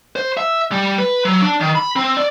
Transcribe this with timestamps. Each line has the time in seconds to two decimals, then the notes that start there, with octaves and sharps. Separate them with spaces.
0.16 C5
0.37 E5
0.72 G3
0.98 B4
1.25 F#3
1.42 D4
1.61 D#3
1.75 B5
1.96 C4
2.17 D5